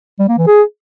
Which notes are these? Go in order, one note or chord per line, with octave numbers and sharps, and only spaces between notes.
G3
A#3
E3
G#4